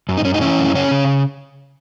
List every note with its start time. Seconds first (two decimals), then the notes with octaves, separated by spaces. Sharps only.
0.09 F#2
0.17 D#4
0.25 F#2 C#4
0.34 D#4
0.41 E3 C#4 E4
0.59 F#2
0.75 C#3 C#4
0.91 C#3